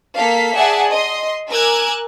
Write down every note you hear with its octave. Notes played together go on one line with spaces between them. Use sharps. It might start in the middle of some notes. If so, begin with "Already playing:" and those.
A#3 A4 F5 B6
G#4 D5 E5 F#5 G#5 A5
D#5 C6
A#4 G#5 D6 E6 F#6 G#6